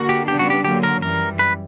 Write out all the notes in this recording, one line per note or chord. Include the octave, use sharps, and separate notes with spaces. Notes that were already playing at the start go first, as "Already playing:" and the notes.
Already playing: D3 A#3 F#4
G4
C#3 G3 B3 D4 G4
F#4
G4
D3 F#3 A#3 G4
A#4
F#2 E3 G3 A#4
B4